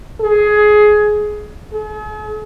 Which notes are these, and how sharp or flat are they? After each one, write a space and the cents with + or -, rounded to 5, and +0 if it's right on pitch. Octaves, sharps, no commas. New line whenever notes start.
G#4 +15
G#4 +45